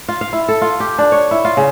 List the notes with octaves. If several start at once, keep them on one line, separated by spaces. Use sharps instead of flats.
F4
F5
E4
A4
F4
G4
D4
C#5
E4
F4
C#3